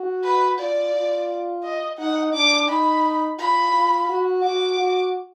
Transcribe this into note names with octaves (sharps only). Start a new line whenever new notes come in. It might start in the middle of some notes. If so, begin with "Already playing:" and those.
Already playing: F#4
B4
F4 D5
F4
D#5
D#4 F#5
D4 D6
D#4 B5
F4 B5
F4
F#4
F#4 D6
F#4